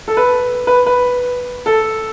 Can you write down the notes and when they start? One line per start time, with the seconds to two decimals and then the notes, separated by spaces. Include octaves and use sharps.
0.08 A4
0.17 B4
0.67 B4
0.86 B4
1.66 A4